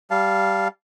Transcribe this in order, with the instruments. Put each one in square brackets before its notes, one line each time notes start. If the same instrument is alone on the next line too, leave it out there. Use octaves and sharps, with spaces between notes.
[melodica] G3 F5 A5